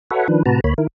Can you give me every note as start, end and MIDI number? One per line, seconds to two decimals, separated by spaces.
0.11 0.27 66
0.11 0.27 69
0.11 0.27 71
0.11 0.27 73
0.11 0.27 76
0.11 0.27 78
0.28 0.43 51
0.28 0.43 53
0.28 0.43 62
0.28 0.43 71
0.46 0.60 45
0.46 0.60 48
0.46 0.60 66
0.46 0.60 71
0.46 0.60 81
0.46 0.60 82
0.64 0.74 38
0.64 0.74 58
0.64 0.74 73
0.64 0.74 83
0.78 0.87 51
0.78 0.87 64
0.78 0.87 70